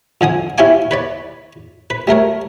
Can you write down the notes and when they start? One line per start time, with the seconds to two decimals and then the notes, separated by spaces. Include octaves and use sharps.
0.21 F2 D3 G#5 D#6
0.58 E4 G4 C#5 F5 G#5 D6
0.91 B4 C#5 D5
1.90 B4
2.07 G3 A3 A#4 C#5